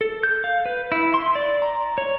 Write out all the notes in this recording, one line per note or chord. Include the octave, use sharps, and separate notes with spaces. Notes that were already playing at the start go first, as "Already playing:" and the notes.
A4
G6
F5
B4
E4
C6
D5
A#5
C#5